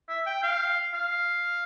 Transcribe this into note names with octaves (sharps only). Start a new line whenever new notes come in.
E5
G5
F5
F5